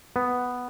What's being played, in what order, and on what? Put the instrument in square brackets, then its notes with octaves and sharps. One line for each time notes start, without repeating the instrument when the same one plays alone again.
[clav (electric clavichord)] B3